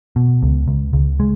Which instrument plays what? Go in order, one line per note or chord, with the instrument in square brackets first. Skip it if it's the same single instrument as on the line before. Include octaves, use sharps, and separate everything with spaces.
[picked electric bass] B2
C#2
C#2
C#2
G#3